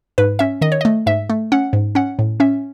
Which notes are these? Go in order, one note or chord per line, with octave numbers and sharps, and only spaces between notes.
G#2 B4
C#4 E5
D#3 D#5
C#5
D#5
A3
G#2 E5
A3
C#4 F#5
G#2
C#4 F#5
A2
C#4 E5